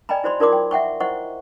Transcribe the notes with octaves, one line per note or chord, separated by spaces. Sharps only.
D5 D#5 G5 G#5 A#5 B5
E4 F#4 C5 D5 B5 C6
D#4 F4 A#4 D5 C6 D6
G5
E5 F#5 G5 C#6
E4 C5 D#5 F#5 C#6